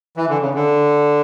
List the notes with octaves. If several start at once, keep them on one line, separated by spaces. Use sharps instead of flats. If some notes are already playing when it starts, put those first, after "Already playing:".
E3
D3
C#3
D3